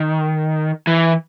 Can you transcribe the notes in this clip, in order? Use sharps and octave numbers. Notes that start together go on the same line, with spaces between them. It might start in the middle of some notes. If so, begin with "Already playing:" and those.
Already playing: D#3
E3